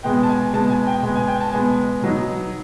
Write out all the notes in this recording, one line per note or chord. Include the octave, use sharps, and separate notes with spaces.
B2 G#3 B3 G5
A5
G#5
B2 G#3 B3 A5
G#5
G5
B2 G#3 B3 G#5
G#5
G5
A5
B2 G#3 B3 G#5
B2 F#3 B3 D#4